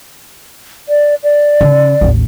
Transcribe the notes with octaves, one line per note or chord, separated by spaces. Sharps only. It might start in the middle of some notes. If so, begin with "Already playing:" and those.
D5
D5
C#3
A1 D#2